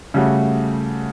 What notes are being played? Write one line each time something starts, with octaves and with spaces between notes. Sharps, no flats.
C#3 G3 A3 F#4